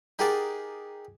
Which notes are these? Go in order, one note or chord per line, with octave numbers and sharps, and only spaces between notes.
D#4 G4 G#4 A#4 F#5 A5